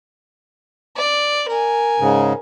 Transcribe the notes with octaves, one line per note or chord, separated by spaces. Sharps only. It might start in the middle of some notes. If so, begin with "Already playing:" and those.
D5
A#4 G#5
G#2 C#3